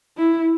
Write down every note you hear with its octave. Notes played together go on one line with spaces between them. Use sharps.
E4